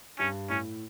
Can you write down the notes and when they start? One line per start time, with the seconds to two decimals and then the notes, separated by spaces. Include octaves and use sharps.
0.19 G2 C#4
0.49 A2 C#4